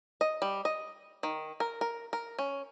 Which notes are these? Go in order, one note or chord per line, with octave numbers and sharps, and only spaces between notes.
D#5
G3
D#5
D#3
A#4
A#4
A#4
C#4